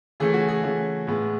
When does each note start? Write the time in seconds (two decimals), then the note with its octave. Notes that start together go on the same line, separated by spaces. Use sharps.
0.20 C#3 E3 A3 G#4
0.34 F#4
0.49 G#4
0.63 C#3 E3 A3
1.07 A2 G#3 B3